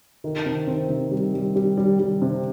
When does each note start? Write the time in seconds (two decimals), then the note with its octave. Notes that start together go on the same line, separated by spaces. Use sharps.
0.24 D#3
0.46 C3
0.67 C4
0.89 C3
1.11 G3
1.34 G3
1.56 G3
1.78 G3
1.99 G3
2.22 C3